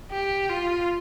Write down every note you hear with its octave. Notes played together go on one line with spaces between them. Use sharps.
G4
F4